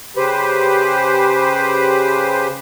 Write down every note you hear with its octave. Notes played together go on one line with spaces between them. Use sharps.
C#3 G4 B4 C5